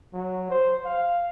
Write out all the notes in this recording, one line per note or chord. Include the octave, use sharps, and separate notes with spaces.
F#3
C5
F5